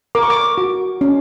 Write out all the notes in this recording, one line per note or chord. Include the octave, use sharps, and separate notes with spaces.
A#4 D6
C#6
D6
F#4
C#4